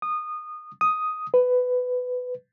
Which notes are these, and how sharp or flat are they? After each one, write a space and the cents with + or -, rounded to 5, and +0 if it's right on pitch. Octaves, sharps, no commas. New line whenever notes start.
D#6 -20
D#6 +5
B4 +15